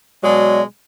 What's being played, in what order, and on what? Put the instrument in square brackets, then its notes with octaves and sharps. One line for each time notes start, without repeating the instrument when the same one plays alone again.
[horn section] B2 F#3 G#3 [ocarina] D5